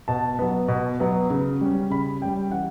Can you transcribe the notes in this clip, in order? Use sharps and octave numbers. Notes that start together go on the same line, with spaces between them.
B2 A5
F#3 B3
B2
F#3 B3
C#3
G3 C#4
C#3 B5
G3 C#4 G5
E3 F#5